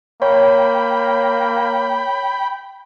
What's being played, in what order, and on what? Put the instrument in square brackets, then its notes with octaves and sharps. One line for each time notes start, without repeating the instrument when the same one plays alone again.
[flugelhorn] A#3 [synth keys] C#5 [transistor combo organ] G5 B5